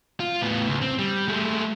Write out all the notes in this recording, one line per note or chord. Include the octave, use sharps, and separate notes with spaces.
F4
A2 B3
C#2
C4
G3
G#3 A3